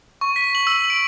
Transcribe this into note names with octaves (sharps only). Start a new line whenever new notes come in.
C#6
B6
F#7
E6
D7